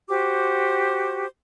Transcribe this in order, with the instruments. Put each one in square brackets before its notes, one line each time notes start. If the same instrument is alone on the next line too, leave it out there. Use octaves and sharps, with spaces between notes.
[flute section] F#4 G4 C5 D6